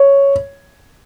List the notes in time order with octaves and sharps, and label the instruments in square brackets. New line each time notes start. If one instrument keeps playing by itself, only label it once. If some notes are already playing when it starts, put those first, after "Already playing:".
Already playing: [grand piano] C#5